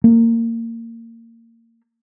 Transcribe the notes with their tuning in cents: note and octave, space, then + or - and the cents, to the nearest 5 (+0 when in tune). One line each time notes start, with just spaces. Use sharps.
A#3 -25